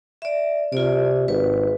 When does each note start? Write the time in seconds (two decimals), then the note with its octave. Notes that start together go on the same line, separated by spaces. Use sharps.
0.22 D5 E5
0.72 C3 F4 D5
1.28 G#1 B4